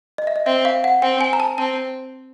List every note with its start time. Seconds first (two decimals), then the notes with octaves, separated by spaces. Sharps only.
0.18 D#5
0.27 E5
0.36 D#5
0.46 C4 E5
0.65 F5
0.84 F#5
1.02 C4 G5
1.21 G#5
1.33 A#5
1.40 A5
1.58 C4 A5